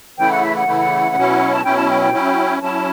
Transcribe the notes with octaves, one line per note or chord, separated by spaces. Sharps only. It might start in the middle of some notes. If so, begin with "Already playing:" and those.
C#3 E3 A3 E4 G5
F#5
E5
F#5
C#3 E3 A3 E4
B2 F#3 C#4 E4
A5
B2 F#3 C#4 E4 G5
A5
G5
G5
F#3 C#4 E4
F#3 C#4 E4 A5